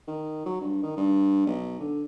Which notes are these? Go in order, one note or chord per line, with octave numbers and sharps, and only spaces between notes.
D#3
F#3
G2
D#3
G2
B1
D3